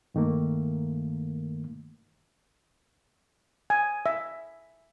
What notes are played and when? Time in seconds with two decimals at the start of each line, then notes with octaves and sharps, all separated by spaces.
0.15 G2 D#3 A3 A#3
3.70 G#5
4.06 E5